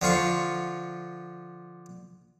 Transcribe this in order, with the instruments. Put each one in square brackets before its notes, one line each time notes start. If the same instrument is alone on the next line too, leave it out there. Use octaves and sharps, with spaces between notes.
[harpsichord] D3 F3 F4 C#6